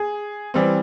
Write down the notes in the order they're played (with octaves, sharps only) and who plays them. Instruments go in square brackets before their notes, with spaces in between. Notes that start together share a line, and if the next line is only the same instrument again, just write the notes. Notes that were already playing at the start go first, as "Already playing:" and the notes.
Already playing: [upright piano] G#4
E3 G3 C4